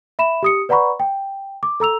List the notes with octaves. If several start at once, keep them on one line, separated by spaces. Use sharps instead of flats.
E5 B5 E7
G4 D#6 C#7
B4 D5 F#5 A#5 B5 C#6
G5
D6
A4 A#5 E6 F7